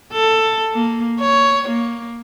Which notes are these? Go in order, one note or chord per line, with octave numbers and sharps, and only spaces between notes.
A4
A#3
C#5
A#3